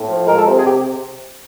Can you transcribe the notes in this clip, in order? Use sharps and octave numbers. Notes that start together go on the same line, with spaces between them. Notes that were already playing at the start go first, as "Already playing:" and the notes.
Already playing: A2
F3
G#3 A#4
A4
C3
G#4
C3 G4